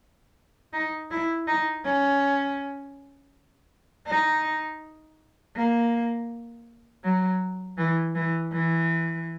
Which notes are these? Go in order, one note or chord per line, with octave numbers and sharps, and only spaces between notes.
D#4
E4
D#4
C#4
D#4
A#3
F#3
E3
E3
E3